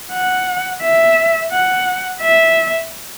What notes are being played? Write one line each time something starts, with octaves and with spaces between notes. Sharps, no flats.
F#5
E5
F#5
E5